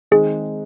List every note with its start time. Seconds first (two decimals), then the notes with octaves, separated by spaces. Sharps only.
0.11 D#3 G#3 C4 D#4 G#4